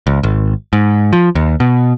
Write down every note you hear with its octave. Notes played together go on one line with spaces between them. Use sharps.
C#2
G#1
G#2
F3
D#2
B2